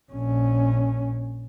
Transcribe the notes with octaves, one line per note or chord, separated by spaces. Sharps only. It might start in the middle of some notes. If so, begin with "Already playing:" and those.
A#1 C#4